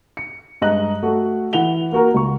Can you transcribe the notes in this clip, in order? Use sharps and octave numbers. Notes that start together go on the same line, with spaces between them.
C#7
G2 G#3 D#5 A#5 F#6 F#7
A3 F#4
E3 F#5 F7 G7
A#3 F#4 A#4
C#2 C#6